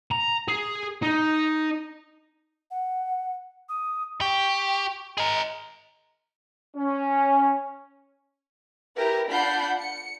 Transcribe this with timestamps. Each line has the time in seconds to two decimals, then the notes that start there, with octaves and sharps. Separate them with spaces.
0.11 A#5
0.48 G#4
1.03 D#4
2.71 F#5
3.69 D#6
4.21 G4 C#6
5.18 G#4 A#4 D#5
6.76 C#4
8.96 E4 G4 A#4 B4
9.29 D4 F4 F#5 B5 G6 C7
9.77 C#7